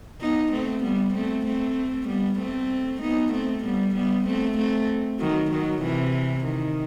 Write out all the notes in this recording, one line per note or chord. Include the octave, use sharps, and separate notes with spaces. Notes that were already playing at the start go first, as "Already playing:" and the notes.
B3 D#4
A3 C4
G3 B3
A3 C4
A3 C4
G3 B3
A3 C4
B3 D#4
A3 C4
G3 B3
G3 B3
A3 C4
A3 C4
D#3 F#3
D#3 F#3
C3 E3
D#3